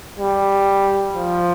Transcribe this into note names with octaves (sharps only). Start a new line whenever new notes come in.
G3
F3